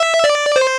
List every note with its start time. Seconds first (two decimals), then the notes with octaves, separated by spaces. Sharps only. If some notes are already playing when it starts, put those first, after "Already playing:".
Already playing: E5
0.24 D5
0.56 C5